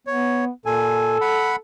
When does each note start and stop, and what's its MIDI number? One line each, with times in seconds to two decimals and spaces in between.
0.07 0.50 59
0.07 0.45 73
0.66 1.18 46
0.66 1.58 69
0.66 1.18 80
1.21 1.56 78
1.21 1.56 83